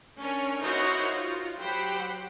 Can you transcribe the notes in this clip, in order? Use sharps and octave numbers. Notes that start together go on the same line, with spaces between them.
C#4 D4 A#4 C#5
D#4 E4 F#4 A#4 C5 C#5
F4
F#3 G4 C5 F#5 G5 B5